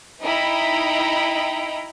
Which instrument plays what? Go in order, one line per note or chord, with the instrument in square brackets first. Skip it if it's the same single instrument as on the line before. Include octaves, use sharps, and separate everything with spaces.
[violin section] D#4 E4 D#5 G5 A#5 B5